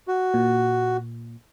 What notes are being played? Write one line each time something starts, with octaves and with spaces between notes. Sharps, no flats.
F#4
A#2